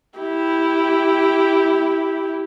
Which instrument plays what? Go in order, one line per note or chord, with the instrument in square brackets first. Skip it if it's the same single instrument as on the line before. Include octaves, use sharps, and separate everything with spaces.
[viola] E4 G4